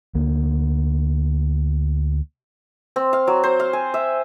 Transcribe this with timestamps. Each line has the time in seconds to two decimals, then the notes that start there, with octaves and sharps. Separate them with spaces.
0.15 D2 A#3
2.96 C4
3.13 F5
3.27 F#3
3.43 C5
3.60 F5
3.73 G#5
3.94 E5